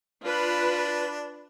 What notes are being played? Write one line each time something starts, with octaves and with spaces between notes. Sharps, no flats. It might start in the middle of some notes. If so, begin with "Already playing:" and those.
D4 F4 B4